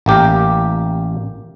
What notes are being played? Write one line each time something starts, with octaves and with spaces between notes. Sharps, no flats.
A1 A#3 G4 A#4